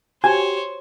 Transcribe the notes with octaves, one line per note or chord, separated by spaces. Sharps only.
F#4 G4 C5 C#5 G#5